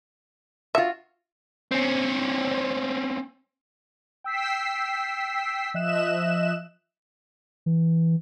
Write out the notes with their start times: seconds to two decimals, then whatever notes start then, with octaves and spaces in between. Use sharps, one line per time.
0.75 F4 F#4 E5
1.72 C4 C#4
4.24 G5 E6 B6 C7
5.74 F3 D#5 E5 F#6 E7
7.66 E3